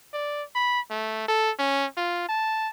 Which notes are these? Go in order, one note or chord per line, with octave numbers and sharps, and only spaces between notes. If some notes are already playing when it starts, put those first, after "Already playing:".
D5
B5
A3
A4
C#4
F4
A5